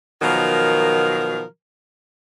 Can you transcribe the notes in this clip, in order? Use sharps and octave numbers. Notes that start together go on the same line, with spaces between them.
B2 D#3 F3 F#3 A#4